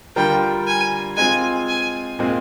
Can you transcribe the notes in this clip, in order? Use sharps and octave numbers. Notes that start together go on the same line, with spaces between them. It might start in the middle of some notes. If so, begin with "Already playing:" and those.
D3 G3 D4 F4 A#4 G5
G#5
G#3 C4 F4 G#5
G#5
A#2 G#3 C4